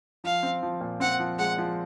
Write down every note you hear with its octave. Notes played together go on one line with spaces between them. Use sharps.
F3 F5
C4
F3
A#2
C4 F#5
F3
G#3 F#5
F3